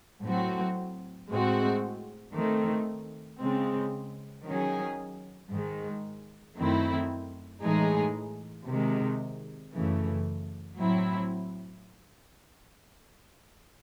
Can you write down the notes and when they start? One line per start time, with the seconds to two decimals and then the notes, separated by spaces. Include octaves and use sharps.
0.23 A2 F#3 C4 F#4
1.29 A2 G#3 C4 F#4
2.35 D#3 A3 C4
3.40 C#3 G#3 C4
4.46 D#3 F#3 C#4 G#4
5.51 G#2 D#3 G#3
6.57 F#2 D#3 A3 C4 E4
7.62 A2 E3 G#3 D#4 G#4
8.68 C3 D#3 G#3
9.73 F#2 C#3 E3 A3
10.79 A2 F#3 C4 E4